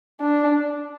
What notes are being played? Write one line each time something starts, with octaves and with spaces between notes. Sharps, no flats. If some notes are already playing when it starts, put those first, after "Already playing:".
D4